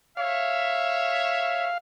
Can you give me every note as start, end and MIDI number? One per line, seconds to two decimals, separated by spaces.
0.17 1.66 73
0.17 1.66 76
0.17 1.78 77